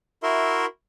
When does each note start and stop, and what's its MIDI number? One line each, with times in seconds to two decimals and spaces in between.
0.23 0.66 64
0.23 0.66 66
0.23 0.66 70
0.23 0.66 76
0.23 0.66 84